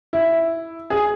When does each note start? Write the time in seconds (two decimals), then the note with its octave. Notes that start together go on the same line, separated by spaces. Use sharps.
0.13 E4
0.90 G#4